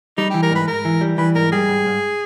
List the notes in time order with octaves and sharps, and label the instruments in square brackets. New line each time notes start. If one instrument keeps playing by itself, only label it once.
[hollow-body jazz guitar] G3 [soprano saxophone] D#4
[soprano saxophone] G4
[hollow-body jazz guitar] E3
[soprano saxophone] A#4
[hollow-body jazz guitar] G#2 [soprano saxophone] B4
[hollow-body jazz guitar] G#2 [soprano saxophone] A#4
[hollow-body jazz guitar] E3
G3
[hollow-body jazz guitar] E3 [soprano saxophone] B4
[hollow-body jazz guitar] G#2 [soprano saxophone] A#4
[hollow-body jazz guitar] G3 [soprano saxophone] G#4
[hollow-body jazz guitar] G#2
G#2